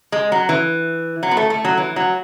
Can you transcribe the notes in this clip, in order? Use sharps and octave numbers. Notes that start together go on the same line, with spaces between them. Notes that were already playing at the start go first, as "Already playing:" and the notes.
G#3
F#3
E3
F#3
B3
A3
A3
F#3
E3
F#3